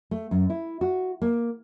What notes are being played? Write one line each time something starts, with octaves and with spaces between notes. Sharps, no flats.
A3
F#2
E4
F#4
A#3